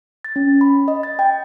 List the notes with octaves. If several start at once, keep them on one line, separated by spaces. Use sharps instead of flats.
A6
C#4
B5
D#5
A6
G5